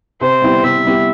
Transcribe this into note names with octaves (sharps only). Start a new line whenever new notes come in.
C3 C5
G3 B3 E4 G4
C3 E5
G3 B3 E4 G4